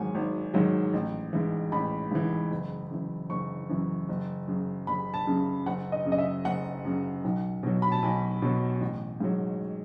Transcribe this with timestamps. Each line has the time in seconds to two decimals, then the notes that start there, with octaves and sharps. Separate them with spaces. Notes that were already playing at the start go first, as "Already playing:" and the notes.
Already playing: G#1 G#2 D#3 F#3 F#5 G#5
0.15 G#1
0.54 G#2 D#3 F#3
0.93 A1
1.33 G#2 E3
1.72 A1 B5
2.11 G#2 E3
2.51 F#1
2.90 F#2 E3
3.29 F#1 C#6
3.69 F#2 E3
4.09 F#1
4.48 F#2 C#3
4.87 F#1 B5
5.14 A5
5.27 F#2 C#3
5.66 F#1 F#5
5.92 D#5
6.05 F#2 C#3
6.12 D#5
6.18 E5
6.45 F#1 F#5
6.85 F#2 C#3
7.24 B1
7.63 B2 F#3
7.82 B5
7.92 A5
8.02 B1 G#5
8.42 B2 F#3
8.81 A1
9.20 G#2 F#3